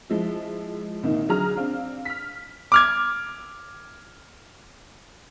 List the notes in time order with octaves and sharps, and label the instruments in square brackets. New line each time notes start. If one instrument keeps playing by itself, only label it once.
[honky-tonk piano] F3 G#3 E4
C2 A#2 D#3 D#4
D3 F#3 G#4 A#5 F6
C4 D4 F5
F6 B6
[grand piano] D6 F6 G#6